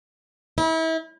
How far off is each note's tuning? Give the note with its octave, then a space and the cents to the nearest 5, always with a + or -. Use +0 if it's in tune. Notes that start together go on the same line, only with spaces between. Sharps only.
E4 -35